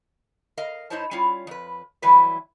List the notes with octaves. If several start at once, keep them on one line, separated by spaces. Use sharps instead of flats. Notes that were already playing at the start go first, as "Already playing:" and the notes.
A#4 D#5 F5
G#2 D#4 E4 C5 C#5 A5
G3 C#4 E4 F4 C#5
F2 B4
E3 F#3 G3 E4 B4